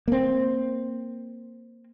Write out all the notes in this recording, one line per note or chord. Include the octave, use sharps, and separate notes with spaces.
A#3 C4